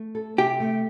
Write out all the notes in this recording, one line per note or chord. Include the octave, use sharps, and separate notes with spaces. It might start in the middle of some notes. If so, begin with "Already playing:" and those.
Already playing: A3
A4
C3 G4
A3